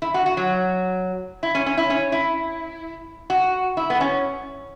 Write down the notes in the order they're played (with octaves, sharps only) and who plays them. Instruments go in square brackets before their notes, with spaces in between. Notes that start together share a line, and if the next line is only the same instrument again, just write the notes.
[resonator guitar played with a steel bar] E4
F#4
F#4
F#3
E4
C#4
C#4
E4
C#4
E4
F#4
E4
B3
C#4